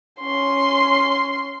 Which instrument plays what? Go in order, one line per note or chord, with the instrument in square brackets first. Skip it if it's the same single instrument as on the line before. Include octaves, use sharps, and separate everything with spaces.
[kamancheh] C#4 C6